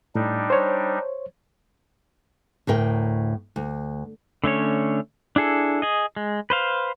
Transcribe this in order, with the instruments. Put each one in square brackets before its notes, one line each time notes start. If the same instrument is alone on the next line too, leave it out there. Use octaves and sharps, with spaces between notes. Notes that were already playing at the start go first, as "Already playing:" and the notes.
[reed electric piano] A2 [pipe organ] G3 D4 D#4
[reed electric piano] C5 C#5
[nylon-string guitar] D2 A2 A#4 G5
D2
[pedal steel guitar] D3 A3 C#4 C#5
D4 E4 G#4 A4
G#4 D#5
G#3
B4 C5 F5